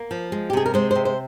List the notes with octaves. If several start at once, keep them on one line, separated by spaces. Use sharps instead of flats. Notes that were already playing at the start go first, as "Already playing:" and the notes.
Already playing: A#3
F3
G#3
G4
C3 G#4
A#4
G#3 C5
C3 C5
C5